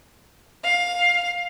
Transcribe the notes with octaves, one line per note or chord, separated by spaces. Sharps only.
F5